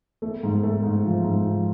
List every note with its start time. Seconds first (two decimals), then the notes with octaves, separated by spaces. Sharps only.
0.22 A3
0.43 G#2
0.63 A3
0.83 G#2
1.05 F3
1.24 G#2
1.45 F3